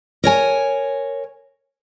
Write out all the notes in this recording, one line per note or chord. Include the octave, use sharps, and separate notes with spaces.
A#4 C#5 G#5